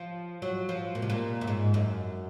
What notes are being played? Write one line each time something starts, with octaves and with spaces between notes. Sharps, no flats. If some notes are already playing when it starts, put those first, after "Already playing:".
Already playing: F3
F#3
F3
A#2
C3
A#2
F#2
G#2
F#2